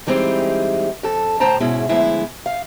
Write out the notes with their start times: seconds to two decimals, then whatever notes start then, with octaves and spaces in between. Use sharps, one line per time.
0.07 E3 G3 G#3 C4 D#4
1.03 F2 A4
1.40 D2 A2 C5 G5 A5 A#5
1.60 G#2 B2 G#3 C#4 E4
1.89 D2 F3 G#3 B3 E4
2.46 F5